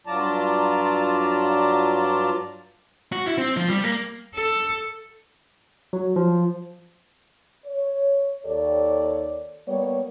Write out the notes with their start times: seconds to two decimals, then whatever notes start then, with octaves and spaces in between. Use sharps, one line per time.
0.07 G2 F#3 F4 D5 A5 A#5
3.12 F#4
3.26 E4
3.38 C4
3.57 F3
3.70 G3
3.84 A#3
4.35 A4
5.93 F#3
6.16 F3
7.65 C#5
8.46 D#2 G4 A4 C#5 D5
9.66 G3 A#3 B3 C#5